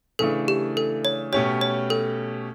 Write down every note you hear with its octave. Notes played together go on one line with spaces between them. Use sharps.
C#3 E3 A3 D4 A4
G4
A4
C#5
B2 A3 C#4 G4 C#5
C#5
A4